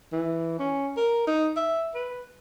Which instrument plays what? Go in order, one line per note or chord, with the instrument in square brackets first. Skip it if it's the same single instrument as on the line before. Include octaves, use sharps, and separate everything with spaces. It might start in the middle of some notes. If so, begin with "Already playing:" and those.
[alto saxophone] E3
C#4
A#4
D#4
E5
B4